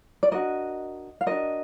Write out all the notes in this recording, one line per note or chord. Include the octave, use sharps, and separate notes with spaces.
D5
D4 F#4 A#4 D#5
F5
D4 F#4 A#4 D#5